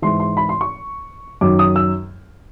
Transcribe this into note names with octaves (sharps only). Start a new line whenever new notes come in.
G#2 E3 C6
C6
B5
C6
C#6
F#2 D#3 F#3 D6
D#6
E6